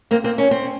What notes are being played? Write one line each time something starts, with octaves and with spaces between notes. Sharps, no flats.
A#3 C4
A#3 C4
C#4
C4